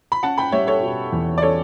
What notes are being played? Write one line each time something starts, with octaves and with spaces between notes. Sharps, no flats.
B5
C#4 F#5 A5
G5 B5
G3 C#5 E5
A4 C#5
B2
E2
D5
C#4 A4 C#5